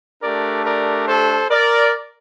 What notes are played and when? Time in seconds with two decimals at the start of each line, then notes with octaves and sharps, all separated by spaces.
0.22 A3 D4 G4 A#4 D5
0.64 A#4 D5
1.07 A4 C5
1.50 A#4 D5